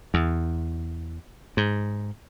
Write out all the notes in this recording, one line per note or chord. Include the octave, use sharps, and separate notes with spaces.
E2
G#2